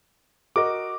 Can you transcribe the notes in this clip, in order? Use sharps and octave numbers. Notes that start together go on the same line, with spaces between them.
F#4 A#4 D#5 D6